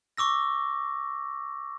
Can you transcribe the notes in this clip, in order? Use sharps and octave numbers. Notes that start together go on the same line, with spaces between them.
C#6 D6 E6 A#6